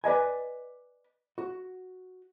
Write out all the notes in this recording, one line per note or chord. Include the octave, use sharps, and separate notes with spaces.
B4 D5 D#5 G#5
F#4